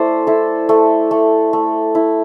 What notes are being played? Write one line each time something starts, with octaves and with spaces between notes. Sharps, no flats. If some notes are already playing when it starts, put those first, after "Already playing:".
Already playing: A3 E4 C5 D5
E4 A4
A3
A3
A3
E4